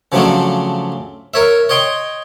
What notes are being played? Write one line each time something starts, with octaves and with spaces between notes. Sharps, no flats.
C#3 F3 F#3 A3 C4 D4
A#4 C#5 E5
C#5 D#5 G5 C6